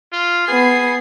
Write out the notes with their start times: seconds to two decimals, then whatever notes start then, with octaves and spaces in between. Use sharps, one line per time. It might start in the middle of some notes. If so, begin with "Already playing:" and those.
0.12 F4
0.48 B3 G#4 C7